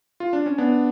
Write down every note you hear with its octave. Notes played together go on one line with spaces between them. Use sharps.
F4
D4
C#4
B3 D4